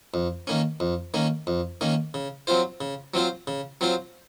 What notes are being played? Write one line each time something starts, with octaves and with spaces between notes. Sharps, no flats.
F2
D#3 A#3 C#4
F2
D#3 A#3 C#4
F2
D#3 A#3 C#4
C#3
F#3 C4 F4 C5
C#3
F#3 C4 F4 C5
C#3
F#3 C4 F4 C5